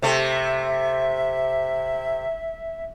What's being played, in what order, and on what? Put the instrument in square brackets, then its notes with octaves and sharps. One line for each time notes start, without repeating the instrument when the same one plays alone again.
[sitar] C3 A3 [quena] E5